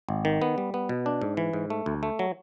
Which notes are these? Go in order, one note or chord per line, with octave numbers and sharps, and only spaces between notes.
G#1
D#3
B3
G3
B3
B2
D4
G#2
E3
G#2
A3
D2
A3
F#3